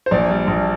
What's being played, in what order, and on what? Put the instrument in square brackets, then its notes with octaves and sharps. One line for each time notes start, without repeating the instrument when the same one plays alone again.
[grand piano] C5
A#1 D5
G3
A#1